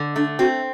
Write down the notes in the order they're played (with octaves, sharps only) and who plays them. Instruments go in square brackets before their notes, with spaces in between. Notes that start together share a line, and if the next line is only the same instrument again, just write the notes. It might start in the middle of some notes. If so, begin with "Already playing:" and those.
Already playing: [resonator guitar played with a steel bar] D3
[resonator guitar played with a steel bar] A3 [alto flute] D4
[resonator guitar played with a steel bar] C4 [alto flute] F#4